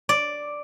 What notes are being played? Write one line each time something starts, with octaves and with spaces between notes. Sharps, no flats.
D5